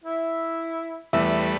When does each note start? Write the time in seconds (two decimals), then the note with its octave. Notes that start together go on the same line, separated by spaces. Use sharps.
0.05 E4
1.13 E2 G3 A3 B4 E5